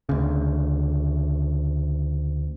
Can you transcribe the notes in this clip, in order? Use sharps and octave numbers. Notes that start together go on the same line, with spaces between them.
D2 C#3